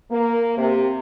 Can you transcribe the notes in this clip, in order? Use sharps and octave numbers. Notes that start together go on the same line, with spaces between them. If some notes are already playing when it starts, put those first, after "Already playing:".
A#3
C3